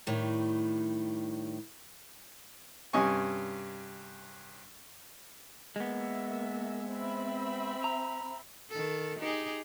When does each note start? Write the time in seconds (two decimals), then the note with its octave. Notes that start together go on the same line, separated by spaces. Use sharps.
0.07 A2 D#3 G3
2.93 G2 C3 C#4 D#5 G#5 C#6
5.76 G#3 A#3 B3 E5
6.89 C4 E5 B5
7.84 A#5
8.70 D#3 A4
9.19 D#4 G4 G#4